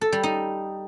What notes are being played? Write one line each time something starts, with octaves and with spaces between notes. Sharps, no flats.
A4
G3
D#4